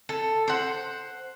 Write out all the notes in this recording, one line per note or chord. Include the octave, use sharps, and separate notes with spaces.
A4
C5 F#5